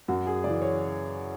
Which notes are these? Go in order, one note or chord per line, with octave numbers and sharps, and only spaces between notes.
F#2 F#4
G#4
C#3 E3 D5
C#5